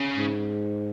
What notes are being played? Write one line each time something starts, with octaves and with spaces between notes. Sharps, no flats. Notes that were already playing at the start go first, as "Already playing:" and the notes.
Already playing: C#3
G#2